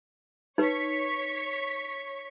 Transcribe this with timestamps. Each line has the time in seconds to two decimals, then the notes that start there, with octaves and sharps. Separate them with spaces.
0.58 D#4 B4 C#5 C#6 B6